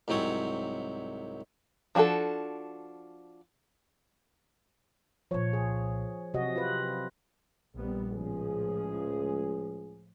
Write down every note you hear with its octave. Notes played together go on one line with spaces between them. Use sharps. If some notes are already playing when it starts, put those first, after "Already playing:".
C2 G#2 F#3 C4 C#5
F3 D4 F#4 G#4 A4
C2 A#2 F3 C#5
G#4
C3 F#3 F#4 D#5
F4 B4
A#1 G3 B3
C#2 A2 F3 G#4